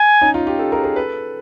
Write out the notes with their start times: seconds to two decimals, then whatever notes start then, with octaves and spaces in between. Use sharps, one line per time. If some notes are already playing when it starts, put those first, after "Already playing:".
Already playing: G#5
0.21 C#4 D#4
0.34 D#4 F4
0.47 F4 G4
0.59 G4 A4
0.72 G#4 A#4
0.84 G#4 A#4
0.96 A4 B4